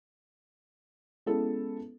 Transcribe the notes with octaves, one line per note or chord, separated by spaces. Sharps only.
G#3 B3 C#4 E4 A4